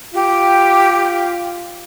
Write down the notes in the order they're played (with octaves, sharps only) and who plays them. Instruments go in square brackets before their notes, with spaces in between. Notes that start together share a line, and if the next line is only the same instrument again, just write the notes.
[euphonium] F4 [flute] G4